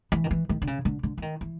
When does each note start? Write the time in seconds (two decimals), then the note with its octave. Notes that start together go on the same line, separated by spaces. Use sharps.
0.12 E3
0.24 D#3
0.31 E3
0.49 D#3
0.62 D3
0.67 C#3
0.85 D3
1.03 D3
1.18 E3
1.22 D#3
1.41 E3